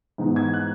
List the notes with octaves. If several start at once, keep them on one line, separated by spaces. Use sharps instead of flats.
G#2 E3 B3 D#4
G#6
F#6